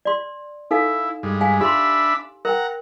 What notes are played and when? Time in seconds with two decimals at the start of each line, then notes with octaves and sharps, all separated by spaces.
0.05 D5 C6
0.71 D#4 E4 A4 F5
1.23 G2 G#3
1.41 F5 G#5
1.61 D4 G4 E5 B5 C6
2.45 A#4 F#5 G5 A#5